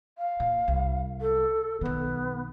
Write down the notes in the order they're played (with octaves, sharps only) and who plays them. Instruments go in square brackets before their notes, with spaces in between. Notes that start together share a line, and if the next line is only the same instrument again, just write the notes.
[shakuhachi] F5
[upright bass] A#2
C2
[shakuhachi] A4
[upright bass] B1 D#3 [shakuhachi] B3